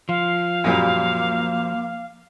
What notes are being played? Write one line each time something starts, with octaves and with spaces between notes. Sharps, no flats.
F3 F5
F#2 A#2 G3 A#3